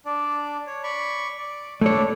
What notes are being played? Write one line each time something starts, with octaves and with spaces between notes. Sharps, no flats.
D4 D5
C#5
D5 B5 C#6
D5
A3 D4 E4 C#5 D5